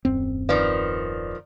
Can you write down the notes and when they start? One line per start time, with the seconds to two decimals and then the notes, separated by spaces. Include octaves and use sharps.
0.05 D#1 F#2 C4
0.49 D#3 F3 B4 D5